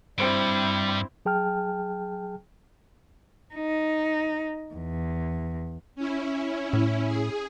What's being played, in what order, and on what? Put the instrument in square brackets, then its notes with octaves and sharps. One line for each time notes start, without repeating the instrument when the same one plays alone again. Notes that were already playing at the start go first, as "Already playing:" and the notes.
[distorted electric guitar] G2 [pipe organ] G3 [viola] C4 E4 [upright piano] C5 D7
[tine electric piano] F#3 G#4 G5 A5 F6
[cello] D#4
E2
[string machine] C#4 E4
[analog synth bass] A2
[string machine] G#4